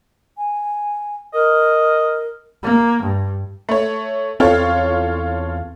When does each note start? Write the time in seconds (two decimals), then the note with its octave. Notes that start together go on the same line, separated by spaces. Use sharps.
0.38 G#5
1.34 A#4 D#5
2.63 A#3
3.04 G2
3.69 A3 C#5
4.40 E2 C4 F4 A4 C#5